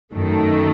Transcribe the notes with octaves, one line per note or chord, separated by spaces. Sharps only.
F#2 D#3 A3